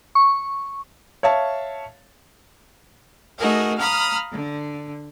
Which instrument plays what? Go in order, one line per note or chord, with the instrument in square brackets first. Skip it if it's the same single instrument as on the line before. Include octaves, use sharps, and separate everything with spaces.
[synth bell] C#6
[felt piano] C#5 E5 F5 A5
[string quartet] A3 D#4 F#4 G#4 A#4
F5 A#5 B5 D#6 F6
D3